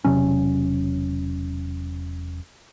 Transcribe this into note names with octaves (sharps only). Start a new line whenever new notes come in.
E1 C3 F#3 C#4